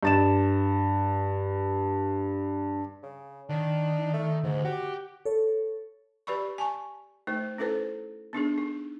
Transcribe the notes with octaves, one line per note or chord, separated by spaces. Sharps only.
G2 A6 E7
C#3
D#3 D4
A3
D2 G#2
F#4 G4
A4 C#5
G4 B4 D5 B5 C#6
G#5 A5 C#6
A3 D#4 C5
C#4 E4 A4 B4 C5
B3 D4 D#4 G#4
D#4